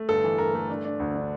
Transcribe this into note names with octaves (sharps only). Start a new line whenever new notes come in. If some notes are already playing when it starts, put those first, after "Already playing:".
Already playing: A3
G1 A4
E3
G1 A#4
A3
D4
D4
D2
D4